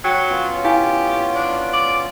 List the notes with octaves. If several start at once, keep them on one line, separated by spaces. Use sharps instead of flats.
F#3 G5
B3 C#4 F4
E4 G4 F5 G#5
D4
D5